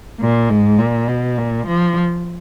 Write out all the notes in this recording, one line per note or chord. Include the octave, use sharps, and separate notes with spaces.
A#2
G#2
A#2
B2
A#2
F3